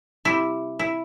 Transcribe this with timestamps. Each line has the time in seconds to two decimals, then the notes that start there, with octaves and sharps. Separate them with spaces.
0.25 C3 G3 E4
0.79 E4